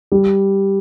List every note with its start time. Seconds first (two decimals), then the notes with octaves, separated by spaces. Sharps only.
0.12 G3